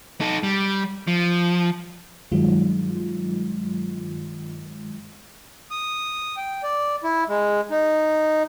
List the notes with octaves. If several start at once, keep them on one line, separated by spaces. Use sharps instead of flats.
D#4 A4
G3
F3
G2 D#3 F#3 G#3 F4
D#6
G5
D5
E4
G#3
D#4